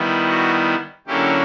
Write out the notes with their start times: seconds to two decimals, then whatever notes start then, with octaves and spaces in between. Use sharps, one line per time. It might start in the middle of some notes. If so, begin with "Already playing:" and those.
Already playing: D#3 G3 B3 E4
0.28 F#4
1.07 D3 F#3 A#3 C#4 E4 G4